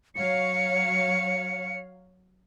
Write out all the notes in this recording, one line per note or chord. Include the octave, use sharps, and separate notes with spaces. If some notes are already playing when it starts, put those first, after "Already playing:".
F#3 C#5 F5 C#7